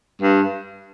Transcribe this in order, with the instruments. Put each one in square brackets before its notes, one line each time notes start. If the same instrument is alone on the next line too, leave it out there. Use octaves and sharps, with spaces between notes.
[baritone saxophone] G2